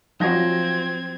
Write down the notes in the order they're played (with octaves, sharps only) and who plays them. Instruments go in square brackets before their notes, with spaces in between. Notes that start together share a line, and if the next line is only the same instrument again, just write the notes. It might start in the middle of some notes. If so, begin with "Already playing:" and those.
[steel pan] F3 F#3 F#4 [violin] C4 G#6 [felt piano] F4 A#6